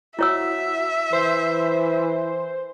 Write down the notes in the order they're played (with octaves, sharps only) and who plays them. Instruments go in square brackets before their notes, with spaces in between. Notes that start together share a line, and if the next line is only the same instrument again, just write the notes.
[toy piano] E4 C#5 E6 [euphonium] F#4 [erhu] E5
[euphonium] E3 [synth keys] C5